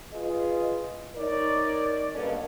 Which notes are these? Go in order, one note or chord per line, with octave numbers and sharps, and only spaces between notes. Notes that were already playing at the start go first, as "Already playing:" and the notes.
F4 G#4 B4 D#5
D#4 A#4 C#5 D5
G2 B2 A#3 C#4 A4